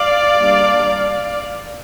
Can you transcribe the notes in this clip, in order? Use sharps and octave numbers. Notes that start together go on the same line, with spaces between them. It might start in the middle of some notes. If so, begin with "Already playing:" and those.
Already playing: D5 F5
G3 A#3 D4